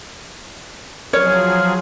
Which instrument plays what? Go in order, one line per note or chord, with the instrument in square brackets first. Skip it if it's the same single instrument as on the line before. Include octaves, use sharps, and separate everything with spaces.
[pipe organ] F3 F#3 G#4 [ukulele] C#5 [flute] F6